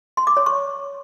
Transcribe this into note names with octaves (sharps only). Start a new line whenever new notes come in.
C6
D6
C#5
C#6